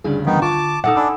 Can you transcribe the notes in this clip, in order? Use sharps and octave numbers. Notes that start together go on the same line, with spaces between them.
D2 G2 C#3 D4 G#4
D#3 E3 G3 B3 D#4
D3 F4 A5 C#6 D6
A#2 D#4 A4 F#5 D6 E6
D4 G#5 B5 D6 E6